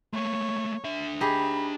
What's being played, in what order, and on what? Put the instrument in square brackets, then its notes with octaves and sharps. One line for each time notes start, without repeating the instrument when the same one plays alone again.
[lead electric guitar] A3 A#3 [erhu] C#5
[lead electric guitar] D4 E5
[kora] D#4 G4 G#4 [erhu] B5